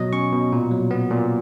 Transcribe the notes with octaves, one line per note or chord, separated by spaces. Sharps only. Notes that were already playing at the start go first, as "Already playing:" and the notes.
Already playing: B2 F#3 D#5
C#4 C#6
B2
A#2
F#3
B3
A#2